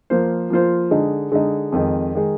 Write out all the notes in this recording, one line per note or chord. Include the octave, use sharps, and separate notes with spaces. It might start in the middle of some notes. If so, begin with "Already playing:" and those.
F3 A#3 F4 C5
F3 A#3 F4 C5
D3 G#3 D#4
D3 G#3 D#4
F2 D#3 G#3
D#3 G#3